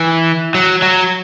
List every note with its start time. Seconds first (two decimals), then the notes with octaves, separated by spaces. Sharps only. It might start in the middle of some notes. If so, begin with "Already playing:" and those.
Already playing: E3
0.55 F#3
0.82 F#3